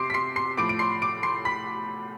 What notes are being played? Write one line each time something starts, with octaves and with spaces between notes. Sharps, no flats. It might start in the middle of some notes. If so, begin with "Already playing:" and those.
Already playing: C3 C6 D6 C7 D7
B6
C6 C7
C6 C7
A2 F3 D6 D7
D7
C6 C7
D6 D7
C6 C7
B5 B6